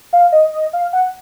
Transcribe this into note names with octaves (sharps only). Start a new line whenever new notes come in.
F5
D#5
D#5
F5
F#5